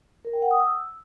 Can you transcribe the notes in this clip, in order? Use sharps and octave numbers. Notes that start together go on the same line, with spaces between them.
A#4
G5
F#5
D#6
E6